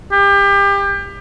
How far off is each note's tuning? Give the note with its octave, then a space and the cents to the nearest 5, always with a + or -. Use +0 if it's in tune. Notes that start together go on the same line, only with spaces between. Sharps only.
G4 +30